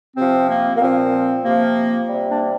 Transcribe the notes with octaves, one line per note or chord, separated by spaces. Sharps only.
C3 F3 C4
A#3
A#3
A#2 F3 C4
C3 F3 A#3
C3 G3
A#3 D4